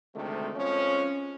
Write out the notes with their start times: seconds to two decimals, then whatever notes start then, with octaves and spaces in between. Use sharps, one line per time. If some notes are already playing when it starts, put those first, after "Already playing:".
0.15 D2 C3 D#3 G#3 A3
0.56 F2 F3 G#3 C#4